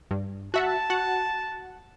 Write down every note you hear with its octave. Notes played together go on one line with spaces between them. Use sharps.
G2
F#4 E5 F#5 A5
F#4 F#5